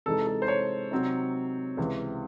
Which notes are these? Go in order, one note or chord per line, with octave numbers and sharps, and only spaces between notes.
C3 E3 G#3 D#4 A4
A4
C5
C#5
C3 F#3 C4 D#4
C#2 C3 E3